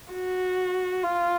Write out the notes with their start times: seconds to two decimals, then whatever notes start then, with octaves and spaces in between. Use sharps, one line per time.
0.13 F#4
1.03 F4